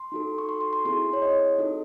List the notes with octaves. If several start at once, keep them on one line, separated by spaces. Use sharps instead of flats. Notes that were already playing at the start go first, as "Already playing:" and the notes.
Already playing: C6
D#4 F#4 A4
C#6
C6
C6
C6
C4 E4 G#4 C6
C#5
D#5
D#4 F#4 A4